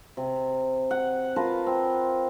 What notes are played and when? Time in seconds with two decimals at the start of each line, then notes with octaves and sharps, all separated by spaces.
0.17 C3
0.91 F#5
1.36 F4 A#4 B4 A5
1.66 C4